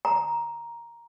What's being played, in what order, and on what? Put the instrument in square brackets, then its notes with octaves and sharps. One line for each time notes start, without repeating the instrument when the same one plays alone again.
[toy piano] A#5